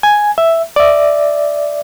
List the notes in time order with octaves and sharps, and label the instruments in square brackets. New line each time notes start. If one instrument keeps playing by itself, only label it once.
[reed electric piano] G#5
E5
D5 E5